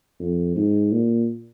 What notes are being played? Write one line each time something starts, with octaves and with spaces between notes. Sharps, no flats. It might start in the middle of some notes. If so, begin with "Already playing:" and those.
F2
G#2
A#2